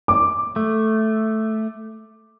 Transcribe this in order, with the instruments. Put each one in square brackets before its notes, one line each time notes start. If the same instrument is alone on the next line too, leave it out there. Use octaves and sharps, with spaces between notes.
[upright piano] D6
[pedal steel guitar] A3